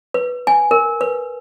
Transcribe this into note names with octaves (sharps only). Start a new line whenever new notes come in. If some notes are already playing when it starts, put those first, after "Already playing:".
B4
G#5
A#4
B4